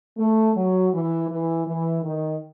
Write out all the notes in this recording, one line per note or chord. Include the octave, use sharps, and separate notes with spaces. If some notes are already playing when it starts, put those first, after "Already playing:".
A3
F#3
E3
E3
E3
D#3